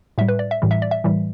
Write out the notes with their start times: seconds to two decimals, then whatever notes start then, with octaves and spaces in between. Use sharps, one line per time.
0.18 A2 G3 E5
0.28 B4
0.39 D5
0.51 E5
0.62 A2 E3 G3
0.71 E5
0.82 D5
0.91 E5
1.04 A2 E3 G3